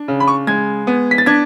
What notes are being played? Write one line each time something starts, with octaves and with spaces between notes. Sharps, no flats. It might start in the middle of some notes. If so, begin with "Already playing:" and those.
Already playing: D4
C#3
B5
C#6
G#3 G#6
B3
B6
A6
D4 G#6